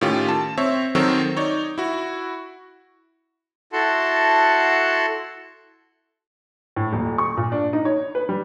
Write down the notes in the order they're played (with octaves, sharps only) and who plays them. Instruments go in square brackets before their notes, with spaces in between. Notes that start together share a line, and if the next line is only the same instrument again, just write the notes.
[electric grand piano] A2 D#3 C#4 F4 G4
A5
C4 C#5 E5
D#3 F#3 C4 A4 A#4 C#5
D#4 C#5 D5
E4 F#4
[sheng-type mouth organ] E4 F#4 A4 F#5 A5 C6
[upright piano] A2
D#1
C#6
A#2
D4
D#4
C#5
B4
G3